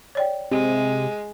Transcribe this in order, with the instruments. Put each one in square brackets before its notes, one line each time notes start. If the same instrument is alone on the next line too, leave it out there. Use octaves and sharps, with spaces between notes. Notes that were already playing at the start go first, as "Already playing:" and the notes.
[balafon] C#5 D5 G5
[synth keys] C3 [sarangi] G#3